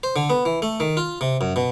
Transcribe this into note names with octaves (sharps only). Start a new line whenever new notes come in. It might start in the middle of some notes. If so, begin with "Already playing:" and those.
C5
D3
B3
E3
A3
D#3
F4
C3
F#2
B2